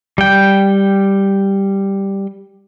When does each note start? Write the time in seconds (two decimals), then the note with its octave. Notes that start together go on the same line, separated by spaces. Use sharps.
0.18 G3 G5